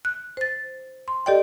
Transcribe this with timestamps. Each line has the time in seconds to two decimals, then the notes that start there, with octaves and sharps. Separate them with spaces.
0.05 F#6
0.37 C5 A6
1.08 C6
1.26 G4 A4 D5 D#5 G5